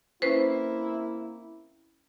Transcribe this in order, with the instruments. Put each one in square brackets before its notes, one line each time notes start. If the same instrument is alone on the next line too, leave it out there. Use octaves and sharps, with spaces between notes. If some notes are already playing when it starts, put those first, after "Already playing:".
[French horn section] A#3 C4 E4 [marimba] C#4 B4 C5